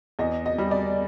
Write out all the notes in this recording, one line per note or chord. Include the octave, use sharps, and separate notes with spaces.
E2 D#5
D#5
G3
D5